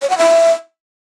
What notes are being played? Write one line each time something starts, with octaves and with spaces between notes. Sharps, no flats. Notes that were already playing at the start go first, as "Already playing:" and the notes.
C#5
F#5
E5